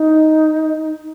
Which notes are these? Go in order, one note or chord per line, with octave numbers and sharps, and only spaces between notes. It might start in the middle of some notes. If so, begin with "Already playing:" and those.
Already playing: D#4